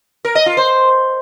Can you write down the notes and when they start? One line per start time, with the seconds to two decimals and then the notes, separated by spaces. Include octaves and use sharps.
0.25 A#4
0.35 D#5
0.46 F4
0.57 C5